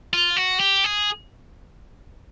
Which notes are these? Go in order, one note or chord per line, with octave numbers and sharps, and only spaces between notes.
F4
F#4
G4
G#4